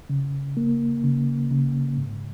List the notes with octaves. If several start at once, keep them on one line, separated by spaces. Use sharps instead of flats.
C#3
A#3
C#3
C#3
G#2